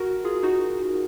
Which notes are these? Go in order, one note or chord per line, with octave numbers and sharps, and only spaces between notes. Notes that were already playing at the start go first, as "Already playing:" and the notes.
Already playing: F#4 A#4
F4 G#4
D#4 F#4